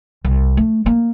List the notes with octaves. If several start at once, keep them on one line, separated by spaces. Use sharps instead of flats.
C2
A3
A#3